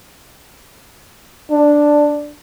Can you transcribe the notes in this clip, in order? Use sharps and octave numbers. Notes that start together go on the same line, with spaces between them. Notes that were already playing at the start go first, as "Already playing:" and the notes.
D4